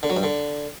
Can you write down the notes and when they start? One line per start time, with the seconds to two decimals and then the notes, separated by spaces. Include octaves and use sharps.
0.03 D3
0.10 F#3
0.16 G2
0.23 D3